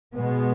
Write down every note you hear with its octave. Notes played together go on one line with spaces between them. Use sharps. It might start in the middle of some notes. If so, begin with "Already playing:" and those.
B2 G#3 B3